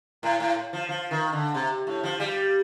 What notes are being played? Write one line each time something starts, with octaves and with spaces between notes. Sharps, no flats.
A2
A2
F3
F3
D#3
D3
C3
A2
F3
G3